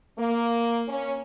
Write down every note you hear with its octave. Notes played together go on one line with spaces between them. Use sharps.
A#3
C#4